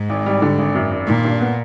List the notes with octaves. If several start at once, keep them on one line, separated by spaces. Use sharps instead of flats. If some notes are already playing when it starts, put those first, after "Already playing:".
Already playing: G#2
G#1
G3
D3
G#1
F#2
G#1
A#2 D#3
G2
B3